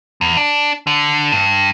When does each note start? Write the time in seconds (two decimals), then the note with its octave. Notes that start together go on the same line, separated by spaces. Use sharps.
0.21 E2
0.37 D4
0.87 D3
1.32 G2